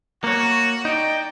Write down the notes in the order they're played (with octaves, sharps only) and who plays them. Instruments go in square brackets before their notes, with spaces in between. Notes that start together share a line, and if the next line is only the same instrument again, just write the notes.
[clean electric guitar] A#3 C#5 [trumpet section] F#4
[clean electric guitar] D#4 [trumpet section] D5 G5